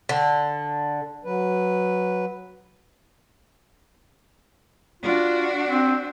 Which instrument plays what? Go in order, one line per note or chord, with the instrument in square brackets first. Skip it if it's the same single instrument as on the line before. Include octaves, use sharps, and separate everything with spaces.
[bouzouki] D3
[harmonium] F#3 B4
[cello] D4 F#4 [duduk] F4
[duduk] C4